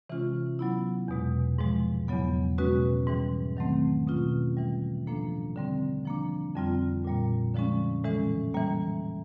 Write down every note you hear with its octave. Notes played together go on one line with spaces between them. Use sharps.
C3 E3 G#3 C#4 F4
F#3 B3 E4
E2 B2 G#3
G#2 F3 G#3
E2 C#3 F#3 B3
B2 G#3 C#4 F#4 B4
G#2 E3 G3
D#3 F#3 A3 C4
B2 G#3 C#4 F4
G#2 E3 G3
A2 F3 A#3 D4
D3 G3 C4
F3 A#3 D4
F2 D3 G3 C4 F4
A#2 G3 A#3
D3 F3 G#3 C#4
A2 E3 G#3 C#4
E3 G3 A#3